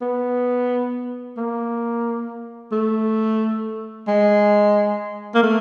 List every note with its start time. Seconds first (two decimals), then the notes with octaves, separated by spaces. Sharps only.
0.02 B3
1.37 A#3
2.72 A3
4.08 G#3
5.35 A#3
5.43 A3